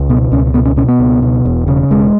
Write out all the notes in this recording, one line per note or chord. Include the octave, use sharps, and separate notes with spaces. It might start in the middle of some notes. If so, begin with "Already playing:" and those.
Already playing: C#2
B2 B3
C#2 C#4
B2 B3
C#4
B2 C#4
B3
C#2
B2
E1
C#3
E1 G#3